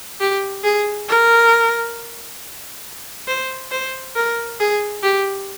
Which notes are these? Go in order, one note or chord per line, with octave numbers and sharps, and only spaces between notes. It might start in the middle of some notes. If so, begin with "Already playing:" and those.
G4
G#4
A#4
C5
C5
A#4
G#4
G4